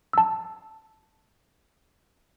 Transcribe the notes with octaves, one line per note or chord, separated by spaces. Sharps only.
A5 E6